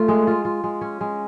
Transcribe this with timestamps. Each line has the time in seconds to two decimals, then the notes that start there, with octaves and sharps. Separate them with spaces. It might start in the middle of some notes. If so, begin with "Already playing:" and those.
Already playing: A3 F4
0.08 G#3
0.27 F4
0.45 F4
0.64 G#3
0.81 C#4
1.01 G#3